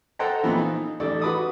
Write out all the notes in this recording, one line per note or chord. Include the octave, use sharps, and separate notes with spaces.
A4 C5 D#5 F#5 G5 A#5
A#2 E3 F3 B3 C4
D#4
A1 D#4 A4 D5
F#4 B4 B5 D6 D#6